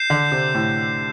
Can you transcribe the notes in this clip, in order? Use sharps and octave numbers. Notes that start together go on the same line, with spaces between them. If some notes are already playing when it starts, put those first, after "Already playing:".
Already playing: G6 C7 E7
D3
C3
A2